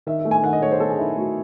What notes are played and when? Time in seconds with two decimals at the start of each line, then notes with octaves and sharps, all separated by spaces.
0.07 D#3 E5
0.19 E5
0.25 A3
0.31 G#5
0.43 D#3 F#5
0.53 D#5
0.62 A3 C#5
0.72 C5
0.80 A3 A4
0.89 G#4
0.98 D#3 E4
1.16 A3 F#4